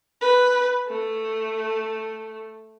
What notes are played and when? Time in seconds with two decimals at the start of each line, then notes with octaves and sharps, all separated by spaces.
0.21 B4
0.88 A3